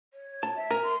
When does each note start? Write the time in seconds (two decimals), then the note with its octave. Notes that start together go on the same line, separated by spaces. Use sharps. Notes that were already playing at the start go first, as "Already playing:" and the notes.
0.13 C#5
0.43 A5
0.56 E5
0.71 A#4 G#5 A#5
0.84 C6